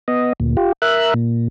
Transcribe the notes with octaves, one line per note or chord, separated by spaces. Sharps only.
B3 D#5
D2 A#2
F4 G4
A#4 E5 F#6
A#2